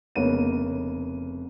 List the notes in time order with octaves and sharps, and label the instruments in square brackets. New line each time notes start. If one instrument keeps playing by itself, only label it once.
[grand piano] F1 C#3 A#3 B3 C#5 D#7